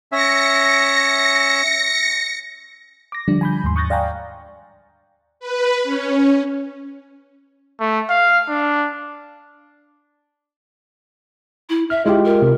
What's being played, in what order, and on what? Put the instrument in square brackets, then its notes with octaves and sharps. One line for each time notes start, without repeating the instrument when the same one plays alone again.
[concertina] C#4 E5 [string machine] A#6 C#7
[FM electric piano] D6 A#6
D3 F3 G3 D4
G#5 B5 G6
D#2 G#2 C6
C#6 D#6 F#6 G6 A6 A#6
D5 F5 G5 G#5 A#5
[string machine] B4
C#4
[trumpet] A3
F5
D4
[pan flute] E4
[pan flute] E5 [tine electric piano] F6
[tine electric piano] G#3 F4 G4 [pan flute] E4
[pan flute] A#4
[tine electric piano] C3